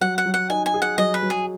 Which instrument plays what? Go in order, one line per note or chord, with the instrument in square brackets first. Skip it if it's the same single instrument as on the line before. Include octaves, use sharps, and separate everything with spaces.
[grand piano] F#3 [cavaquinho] F#5
[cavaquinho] F#5
[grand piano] F#3
[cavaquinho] F#5
[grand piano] D#4 [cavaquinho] G#5
[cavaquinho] G#5
[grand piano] G#4
[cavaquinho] F#5
[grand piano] F#3 [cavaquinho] D#5
[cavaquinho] B4
[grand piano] F#3
[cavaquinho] G#4